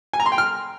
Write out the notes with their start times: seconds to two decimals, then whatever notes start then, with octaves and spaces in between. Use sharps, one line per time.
0.13 G#5
0.20 A#5
0.26 C6
0.32 G5
0.38 F6